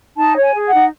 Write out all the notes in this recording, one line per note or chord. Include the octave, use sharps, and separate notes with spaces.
D#4 A5
C#5
G#5
G#4
F#5
D#4